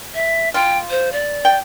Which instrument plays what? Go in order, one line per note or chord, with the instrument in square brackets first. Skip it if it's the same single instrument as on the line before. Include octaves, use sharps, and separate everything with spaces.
[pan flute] E5
[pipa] F4 [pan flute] G5
[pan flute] C5
D5
[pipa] G5